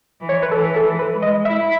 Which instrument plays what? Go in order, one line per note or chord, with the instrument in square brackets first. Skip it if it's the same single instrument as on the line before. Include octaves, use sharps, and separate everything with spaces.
[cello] E3
[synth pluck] C#5
B4
[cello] E3 [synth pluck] A4
[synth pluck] A4
[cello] E3
[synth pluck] B4
[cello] G#3
[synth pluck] D#5
[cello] E4 [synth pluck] E5